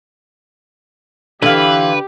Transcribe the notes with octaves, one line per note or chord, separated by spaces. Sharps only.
D3 E3 F4 G4 B4